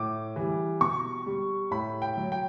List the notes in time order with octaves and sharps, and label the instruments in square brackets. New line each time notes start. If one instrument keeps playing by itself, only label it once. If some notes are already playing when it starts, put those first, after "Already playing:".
Already playing: [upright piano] A2 D6
E3 G3
B2 C#6
G3
A2 B5
G5
F#3
G5